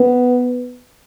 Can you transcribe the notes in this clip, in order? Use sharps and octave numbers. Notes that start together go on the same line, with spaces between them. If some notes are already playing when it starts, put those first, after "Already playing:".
Already playing: B3